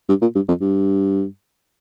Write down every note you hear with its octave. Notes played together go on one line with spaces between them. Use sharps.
G2
A#2
G2
F2
G2